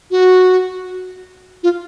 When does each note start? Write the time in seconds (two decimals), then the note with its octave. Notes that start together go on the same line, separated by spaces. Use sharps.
0.11 F#4
1.63 F4